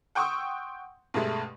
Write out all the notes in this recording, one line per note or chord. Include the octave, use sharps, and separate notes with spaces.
F#5 G5 C6 C#6 D#6 E6
G2 B2 G#3 A3